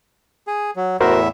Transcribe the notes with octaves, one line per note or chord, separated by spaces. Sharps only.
G#4
F#3
E2 A2 F#4 A#4 C5 E5